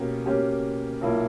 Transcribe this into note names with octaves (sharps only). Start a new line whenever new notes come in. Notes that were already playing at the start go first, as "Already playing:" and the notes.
Already playing: B2 A#3 C#4 G4
B2 A#3 C#4 G4
B1 A#2 A#3 E4